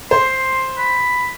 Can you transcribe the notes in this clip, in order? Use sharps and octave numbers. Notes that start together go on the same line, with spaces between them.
C5 C6
B5